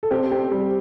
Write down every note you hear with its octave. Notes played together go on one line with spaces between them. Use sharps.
A4
C4 G4
C4
G3